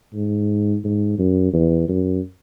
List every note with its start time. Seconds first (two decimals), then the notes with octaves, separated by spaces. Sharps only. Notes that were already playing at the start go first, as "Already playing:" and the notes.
0.14 G#2
0.84 G#2
1.19 F#2
1.53 E2
1.88 F#2